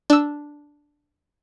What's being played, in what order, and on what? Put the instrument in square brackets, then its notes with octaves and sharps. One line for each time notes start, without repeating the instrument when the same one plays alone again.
[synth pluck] D4 E6